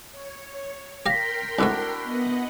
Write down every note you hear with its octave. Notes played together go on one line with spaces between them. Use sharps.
C#5
G4 A#4 F5 G5 C6 A#6 B6
C2 G#2 A3 D4 E4 F#4
B3 D#5 F#5